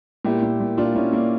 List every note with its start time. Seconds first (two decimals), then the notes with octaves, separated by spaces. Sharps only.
0.25 A#2 E4 G4
0.43 A#2
0.60 A#2
0.77 A#2 D4 F4
0.95 A#2 C#4 E4
1.13 A#2 A#3 D4